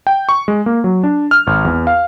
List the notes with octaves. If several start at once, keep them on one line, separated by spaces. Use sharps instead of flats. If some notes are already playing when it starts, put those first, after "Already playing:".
G5
C#6
G#3
A#3
F#3
D4
F6
G#1
E2
F5